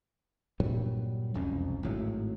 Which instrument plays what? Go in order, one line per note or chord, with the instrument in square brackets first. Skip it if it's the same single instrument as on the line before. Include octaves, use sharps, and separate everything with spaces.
[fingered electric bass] G2 A#2 F#3 G3
E1 C2 F2 C#4
G#1 A2 F#3